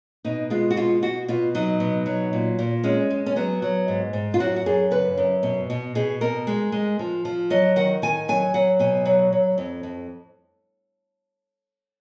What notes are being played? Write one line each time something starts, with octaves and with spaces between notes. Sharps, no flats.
B2 D#4
G#3 F4
F#4
B2 F4
B2 F#4
B2 F4
F#3 D#4
B2
F#3
A#2
A#2
G#3 C#4
G#3
C#4
F#3 B3
F#3
G#2
G#2
F4
F#2 F#4
F#4
F#2 G#4
C#3 B4
F#2
B2
B2
B2 G#4
B2 A#4
G#3
G#3
F3
F3
F#3 D#5
D#3 F#5
D#3 G#5
F#3 G#5
F#3 F#5
B2 G#5
F#3
F#3
F2
F2